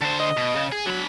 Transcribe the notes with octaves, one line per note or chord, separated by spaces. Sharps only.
D3 C5 A5
D#5
B2
C#3
G#4
D3 F#3 B5